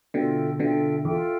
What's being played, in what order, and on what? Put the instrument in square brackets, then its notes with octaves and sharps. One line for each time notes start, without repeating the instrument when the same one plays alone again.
[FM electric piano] B2 D3 [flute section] F4 A4 E5 G5
[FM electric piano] B2 D3 [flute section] F4 A4 E5 G5
[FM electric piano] E2 [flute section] F4 A4 E5 G5